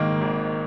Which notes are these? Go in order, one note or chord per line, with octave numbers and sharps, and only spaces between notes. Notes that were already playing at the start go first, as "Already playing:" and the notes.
Already playing: G#1 G#2 D#3 A#3
G#1